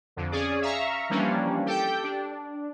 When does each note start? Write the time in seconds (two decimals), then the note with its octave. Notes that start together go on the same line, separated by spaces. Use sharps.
0.16 F2 D3
0.31 C#4 G#4 D5
0.62 E5 F5 A#5 C#6
1.10 E3 F3 G3 A#3 C#4 D4
1.66 G4 A4 G5
2.04 D4